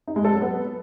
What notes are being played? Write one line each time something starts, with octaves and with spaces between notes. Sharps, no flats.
D#4
G#3
A4
F#3
B3